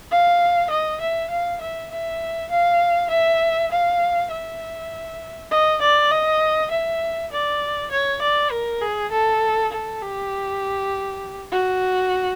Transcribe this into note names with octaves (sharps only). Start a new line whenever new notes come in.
F5
D#5
E5
F5
E5
E5
F5
E5
F5
E5
D#5
D5
D#5
E5
D5
C#5
D5
A#4
G#4
A4
A4
G4
F#4